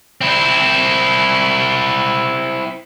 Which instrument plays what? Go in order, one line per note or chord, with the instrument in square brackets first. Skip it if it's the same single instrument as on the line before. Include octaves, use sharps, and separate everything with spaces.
[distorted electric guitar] C4 E4